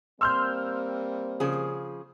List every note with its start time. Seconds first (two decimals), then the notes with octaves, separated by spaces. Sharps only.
0.21 G3 A#3 C4 C6 E6 F6 G6
1.40 C#3 F3 G#4